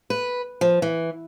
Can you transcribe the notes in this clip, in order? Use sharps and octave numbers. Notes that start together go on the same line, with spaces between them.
B4
F3
E3